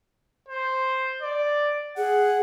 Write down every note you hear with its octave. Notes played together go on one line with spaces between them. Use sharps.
C5
D5
G#4 F#5